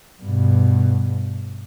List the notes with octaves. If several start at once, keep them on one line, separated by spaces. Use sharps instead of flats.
G2 B2